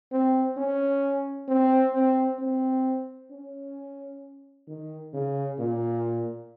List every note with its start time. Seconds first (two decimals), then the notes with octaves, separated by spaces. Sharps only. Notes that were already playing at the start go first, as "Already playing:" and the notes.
0.12 C4
0.57 C#4
1.48 C4
1.94 C4
2.39 C4
3.31 C#4
4.67 D#3
5.14 C#3
5.59 A#2